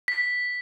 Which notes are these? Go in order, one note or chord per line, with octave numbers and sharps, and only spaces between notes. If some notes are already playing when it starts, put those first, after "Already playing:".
B6